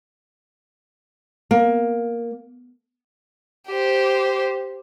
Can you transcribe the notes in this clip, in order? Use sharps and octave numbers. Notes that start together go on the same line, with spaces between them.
A#3
G4 C5